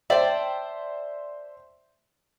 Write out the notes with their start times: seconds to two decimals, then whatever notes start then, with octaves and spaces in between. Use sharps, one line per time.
0.10 C5 D5 E5 G5 A5